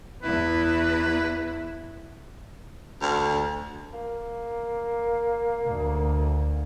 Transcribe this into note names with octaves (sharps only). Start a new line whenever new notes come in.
E2 E4 B4
D2
A#3
D2